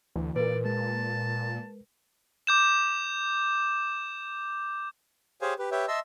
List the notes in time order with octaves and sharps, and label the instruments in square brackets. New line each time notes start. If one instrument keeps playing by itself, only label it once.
[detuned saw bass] D2 [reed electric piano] E3
[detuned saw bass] A#2 [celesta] A#4 B4 [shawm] D5
[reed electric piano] G#3 [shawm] A5
[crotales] D6 G6 E7
[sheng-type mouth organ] G4 G#4 C5 C#5 F5 G#5
G4 B4
G4 B4 C#5 E5 G5
D#5 E5 A5 C6 E6